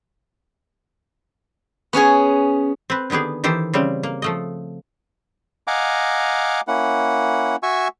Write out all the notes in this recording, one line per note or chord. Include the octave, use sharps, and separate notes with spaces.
B3 C#4 G#4 G#5
C4 B4
D3 D#3 B3 G4 G#4
D#3 E3 G4 A4 C5
C#3 G3 C4
A#3
F3 A3 D#5
D#5 F5 F#5 G#5 A#5 D6
A#3 C#4 E4 F#5
F#4 E5 G#5 C#6 E6